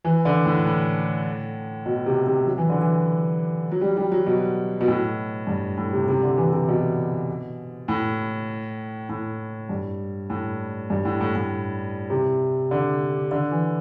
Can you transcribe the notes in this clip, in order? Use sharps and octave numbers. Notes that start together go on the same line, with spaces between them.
E3
D3
A2
A2
B2
C3
C3
F#3
E3
D3
E3
F#3
G3
G3
F#3
B2
B2
A2
G2
A2
C3
C3
D3
E3
C3
B2
A2
A2
G2
A2
G2
A2
A2
A2
C3
D3
D3
E3